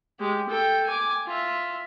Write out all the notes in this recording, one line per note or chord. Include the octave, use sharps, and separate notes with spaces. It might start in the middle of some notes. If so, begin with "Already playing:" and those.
G#3 G4
A4 G5
G#5 D6
F4 E5